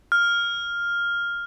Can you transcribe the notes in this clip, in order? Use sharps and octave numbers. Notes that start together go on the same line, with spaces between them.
F6